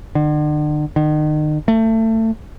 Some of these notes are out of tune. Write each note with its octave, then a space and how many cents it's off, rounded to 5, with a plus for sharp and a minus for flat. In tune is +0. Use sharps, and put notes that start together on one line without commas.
D3 +40
D#3 -35
A3 +25